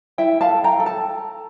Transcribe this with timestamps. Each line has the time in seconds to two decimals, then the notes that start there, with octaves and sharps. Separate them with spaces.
0.18 E4 E5 G5
0.41 F5 A5
0.49 A4
0.64 G5 A#5
0.80 A4
0.86 A5